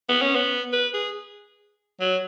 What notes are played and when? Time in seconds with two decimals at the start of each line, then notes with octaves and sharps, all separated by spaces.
0.09 B3
0.22 C#4
0.35 B3
0.73 B4
0.94 G#4
2.01 F#3